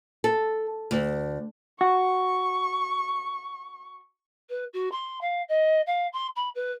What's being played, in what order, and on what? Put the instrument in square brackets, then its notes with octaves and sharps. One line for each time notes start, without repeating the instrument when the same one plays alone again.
[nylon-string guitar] A4
D2
[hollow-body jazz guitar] F#4 [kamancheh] C#6
[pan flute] B4
F#4
C6
F5
D#5
F5
C6
B5
B4